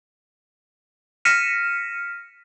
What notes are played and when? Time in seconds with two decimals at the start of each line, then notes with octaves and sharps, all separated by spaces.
1.25 F6 A#6 B6 C#7 D#7 E7